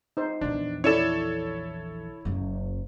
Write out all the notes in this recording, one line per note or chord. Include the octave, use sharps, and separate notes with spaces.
D#4 C5
A#1 E2 D4
E4 A4 C#5 D5 E7
F#1 F#2